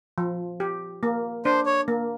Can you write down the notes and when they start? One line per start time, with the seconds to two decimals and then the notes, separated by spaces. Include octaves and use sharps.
0.18 F3
0.60 G4
1.03 A#3
1.45 D4 C5
1.66 C#5
1.88 A#3